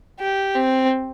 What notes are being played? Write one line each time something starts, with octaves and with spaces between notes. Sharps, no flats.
G4
C4